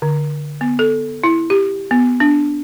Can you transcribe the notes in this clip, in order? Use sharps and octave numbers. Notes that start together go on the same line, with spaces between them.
D3
B3
A4
E4
G4
B3
D4